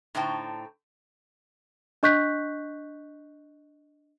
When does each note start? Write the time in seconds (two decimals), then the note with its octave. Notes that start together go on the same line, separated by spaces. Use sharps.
0.15 A2 D3 D#4 C5 G5
2.03 D4 D#5 C#6 F#6 G6 B6